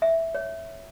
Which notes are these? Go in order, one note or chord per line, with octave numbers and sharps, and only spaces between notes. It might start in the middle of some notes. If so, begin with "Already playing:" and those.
E5
C#5